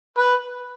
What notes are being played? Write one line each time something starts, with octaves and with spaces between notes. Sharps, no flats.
B4